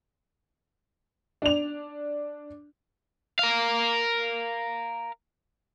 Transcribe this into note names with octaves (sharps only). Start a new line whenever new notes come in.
D4 F7
A#4 F5